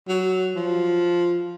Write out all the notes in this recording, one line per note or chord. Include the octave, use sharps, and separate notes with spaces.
F#3
F3